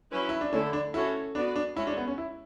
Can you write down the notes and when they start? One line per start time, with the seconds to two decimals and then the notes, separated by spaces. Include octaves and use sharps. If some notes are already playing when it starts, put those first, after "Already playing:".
0.11 F#3 C#4 E4 B4
0.29 E4
0.41 D4
0.53 D3 A3 C#4 E4 A4
0.73 D4
0.94 C#4 E4 F#4 A4 C#5
1.35 B3 D4 F#4 B4 D5
1.56 D4
1.76 G#3 C#4 E4 F#4 C#5
1.87 D4
1.97 B3
2.08 C#4
2.18 E4